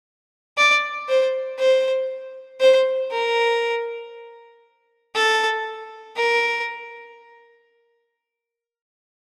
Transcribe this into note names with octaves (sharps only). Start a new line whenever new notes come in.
D5
C5
C5
C5
A#4
A4
A#4